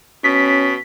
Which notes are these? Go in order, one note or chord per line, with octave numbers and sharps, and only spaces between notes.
B2 C#4 B6